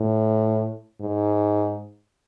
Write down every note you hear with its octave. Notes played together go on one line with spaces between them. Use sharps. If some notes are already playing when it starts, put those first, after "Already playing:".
Already playing: A2
G#2